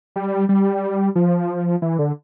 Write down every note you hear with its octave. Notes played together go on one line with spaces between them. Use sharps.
G3
G3
F3
E3
D3